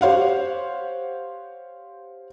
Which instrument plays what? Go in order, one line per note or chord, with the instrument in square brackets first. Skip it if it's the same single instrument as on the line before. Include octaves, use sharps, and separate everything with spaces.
[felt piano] G4 C5 C#5 F5 F#5